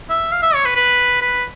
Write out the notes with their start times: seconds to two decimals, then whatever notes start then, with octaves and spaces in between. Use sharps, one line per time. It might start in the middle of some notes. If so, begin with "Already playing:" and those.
0.10 E5
0.32 F5
0.42 E5
0.54 C#5
0.65 B4
0.76 B4
1.21 B4